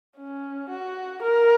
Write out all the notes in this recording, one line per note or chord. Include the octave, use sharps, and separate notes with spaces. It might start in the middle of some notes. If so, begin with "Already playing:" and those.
C#4
F#4
A#4